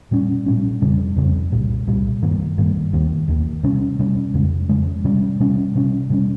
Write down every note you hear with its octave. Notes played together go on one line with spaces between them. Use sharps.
A#2 G3 C#4
A#2 G3 C#4
F2 C#3 G3 C4
F2 C#3 G3 C4
C2 A#2 G3
C2 A#2 G3
G2 D#3 G3 A#3
G2 D#3 G3 A#3
D#2 D#3 A#3
D#2 D#3 A#3
C3 G3 C#4
C3 G3 C#4
F2 C#3 G#3
F2 C#3 G#3
C3 G3 C#4
C3 G3 C#4
C3 G3 C#4
C3 G3 C#4